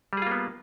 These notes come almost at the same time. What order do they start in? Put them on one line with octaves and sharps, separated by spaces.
G3 G#4 F4 A#3 B3